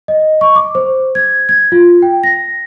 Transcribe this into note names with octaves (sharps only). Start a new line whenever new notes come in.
D#5
C#6
D6
C5
G#6
G#6
F4
G5
A#6